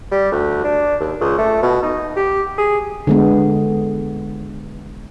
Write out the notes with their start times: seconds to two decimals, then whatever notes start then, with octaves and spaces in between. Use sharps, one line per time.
0.12 G3
0.32 D2
0.64 D4
1.01 D#2
1.21 C#2
1.38 A3
1.62 B2
1.82 D#4
2.16 G4
2.58 G#4
3.07 D3 G#3 B3